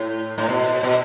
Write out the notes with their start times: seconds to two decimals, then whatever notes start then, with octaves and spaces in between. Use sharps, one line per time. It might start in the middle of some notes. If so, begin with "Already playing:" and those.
Already playing: A2
0.38 A2
0.49 B2
0.83 B2